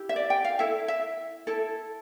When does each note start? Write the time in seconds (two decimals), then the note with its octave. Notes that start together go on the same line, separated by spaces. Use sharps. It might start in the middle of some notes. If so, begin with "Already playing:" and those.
Already playing: E4 G4
0.09 E5
0.16 D5
0.30 G5
0.45 F5
0.59 E4 A4 E5
0.88 E5
1.47 E4 A4